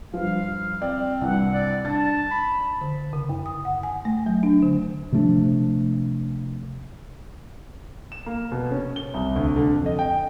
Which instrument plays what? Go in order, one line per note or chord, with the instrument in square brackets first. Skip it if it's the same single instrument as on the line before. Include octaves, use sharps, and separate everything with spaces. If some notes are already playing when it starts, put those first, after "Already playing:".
[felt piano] G2 F3 [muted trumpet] F5
[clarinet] C4 [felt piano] D5
[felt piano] C2 G2 [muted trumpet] F#5
[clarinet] D5
[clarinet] D4 [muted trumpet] A5 [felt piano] A6
[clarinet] B5
[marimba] D3
C#3
F#2
D#6
F#5
G#5
A3
F#3
D4
D3
[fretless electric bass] C3 F3 A3 D4
[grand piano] E7
A#3
B2
C#4
G7
C2
D2
D3
F2
D#5
G5